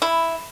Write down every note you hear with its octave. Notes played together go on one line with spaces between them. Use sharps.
E4